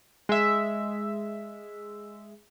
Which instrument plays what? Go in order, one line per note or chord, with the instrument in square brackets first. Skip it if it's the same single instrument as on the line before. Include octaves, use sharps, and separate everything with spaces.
[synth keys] G#3 E5